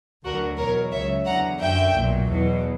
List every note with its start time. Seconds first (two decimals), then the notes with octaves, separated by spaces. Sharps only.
0.24 D2 D3 F#3 F#4 A#4
0.58 E2 B2 F#3 A#4 C#5
0.92 C#2 C#3 F#3 C#5 E5
1.25 E2 D3 F#3 F#5 A#5
1.60 F#2 D3 F#3 E5 G5
1.94 B1 A#2 F#3
2.28 E2 B2 F#3